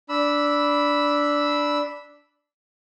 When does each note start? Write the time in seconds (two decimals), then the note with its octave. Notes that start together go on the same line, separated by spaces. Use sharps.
0.09 D4 B5 E6